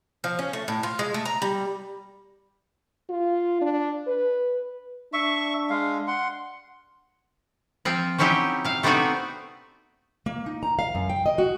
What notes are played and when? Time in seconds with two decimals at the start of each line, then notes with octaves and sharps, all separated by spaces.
0.24 F3
0.39 C#4
0.53 A3
0.68 A2
0.83 F4
0.99 G#3
1.14 A3
1.25 A#5
1.42 G3
3.09 F4
3.61 D4
4.07 B4
5.13 D4 E5 C#6
5.70 G#3 F5
6.07 F#5 C6
7.85 F3 C4 F4
8.18 F#3 C4 C#4 D#4 E4 G4
8.64 C3 F5
8.83 A3 B3 C4 D4 D#4 F#4
10.26 A#3
10.46 D#4
10.63 A#5
10.79 F5
10.95 F#2
11.09 G5
11.26 D#5
11.38 F#4